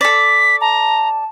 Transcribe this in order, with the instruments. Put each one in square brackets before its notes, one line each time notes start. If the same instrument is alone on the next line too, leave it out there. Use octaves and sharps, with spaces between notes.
[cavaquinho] A4 D5 [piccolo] B6
[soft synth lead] A5 [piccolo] A#5